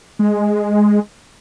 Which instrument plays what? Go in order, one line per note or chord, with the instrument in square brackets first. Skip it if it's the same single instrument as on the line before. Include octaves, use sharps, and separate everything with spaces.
[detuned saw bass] G#3